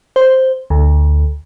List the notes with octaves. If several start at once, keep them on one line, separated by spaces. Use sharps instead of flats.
C5
D2